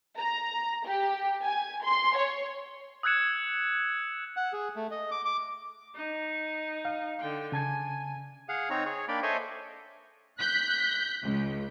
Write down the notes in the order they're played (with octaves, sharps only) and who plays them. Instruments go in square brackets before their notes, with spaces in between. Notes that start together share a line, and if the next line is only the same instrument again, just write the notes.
[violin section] A#5
G4
G#5
C6
C#5
[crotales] D#6 E6 F#6 G#6 C#7 E7
[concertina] F#5
G#4
A3
D#5
D6
D6
[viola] D#4
[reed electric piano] F5
[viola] D3 G5
[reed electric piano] C#3 A5 G#6 [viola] G#5
[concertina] G#4 F5 F#5
C4 D#4 C#5 A#5
G#4 C#5
A#3 D4 D5 G5 B5
A4 C5 C#5 D#5 E5 G#5
[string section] F#6 G6 B6
C#2